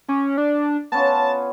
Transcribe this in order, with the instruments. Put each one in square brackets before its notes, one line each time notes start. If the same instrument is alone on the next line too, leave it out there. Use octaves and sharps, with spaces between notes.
[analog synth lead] C#4 [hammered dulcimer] D6
[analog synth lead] D4
[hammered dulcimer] B3 C#4 F4 [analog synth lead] A5